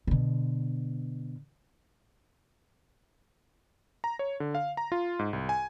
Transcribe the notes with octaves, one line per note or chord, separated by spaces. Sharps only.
B2 D3
A#5
C#5
D3
F5
A#5
F4
G#2
C2
G#5